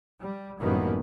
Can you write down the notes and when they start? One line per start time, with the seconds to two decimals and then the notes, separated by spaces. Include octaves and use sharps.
0.20 G3
0.60 A1 F#2 D#3 G3 A#3 B3